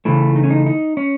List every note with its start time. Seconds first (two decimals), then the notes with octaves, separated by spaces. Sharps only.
0.05 C#3 E3 A3 E4
0.36 D#4
0.43 C#4
0.50 D#4
0.66 D#4
0.97 C#4